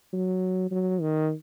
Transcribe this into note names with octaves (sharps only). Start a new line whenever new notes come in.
F#3
F#3
D#3